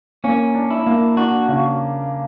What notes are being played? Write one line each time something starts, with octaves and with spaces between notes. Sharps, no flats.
A#3 C#4
D4
E4
A#3
D4 F#4
C#3